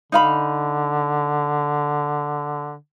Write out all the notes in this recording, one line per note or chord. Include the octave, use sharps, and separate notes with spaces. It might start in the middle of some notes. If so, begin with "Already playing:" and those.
D3 D#4 F5 B5